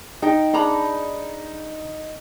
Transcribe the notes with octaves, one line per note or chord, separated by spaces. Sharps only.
D#4 D#5 G5
D4 G#4 A#5 B5